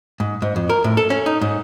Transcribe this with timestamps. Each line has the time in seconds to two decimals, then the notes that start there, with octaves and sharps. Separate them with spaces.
0.20 G#2
0.42 G#2
0.56 F2
0.70 A#4
0.84 A2
0.97 A4
1.10 C#4
1.26 D#4
1.41 G#2